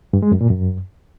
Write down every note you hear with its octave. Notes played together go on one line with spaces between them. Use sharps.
G2
G#3
F#2
A#2
F#2